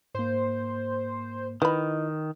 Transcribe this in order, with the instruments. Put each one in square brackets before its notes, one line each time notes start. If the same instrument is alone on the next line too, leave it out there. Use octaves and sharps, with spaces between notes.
[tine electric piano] G#2 A#3 [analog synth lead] C5
[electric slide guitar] D#3 [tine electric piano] E4 D#5 [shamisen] B4 B5